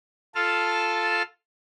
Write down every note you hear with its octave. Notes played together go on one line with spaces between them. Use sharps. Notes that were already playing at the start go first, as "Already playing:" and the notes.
F4 A4 F5 A5 F6